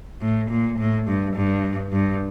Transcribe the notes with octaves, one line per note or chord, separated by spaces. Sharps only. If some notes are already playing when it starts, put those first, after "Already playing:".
A2
A#2
A2
G2
G2
G2